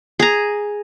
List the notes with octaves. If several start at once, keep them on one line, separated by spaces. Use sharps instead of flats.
G#4 A#5